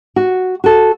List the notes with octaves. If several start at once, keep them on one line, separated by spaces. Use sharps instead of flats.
F#4
F#4 A4